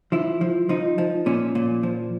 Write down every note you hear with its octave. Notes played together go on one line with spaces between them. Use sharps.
F3 E4
F3
F3 D#4
F3
A#2 C#4
A#2
F3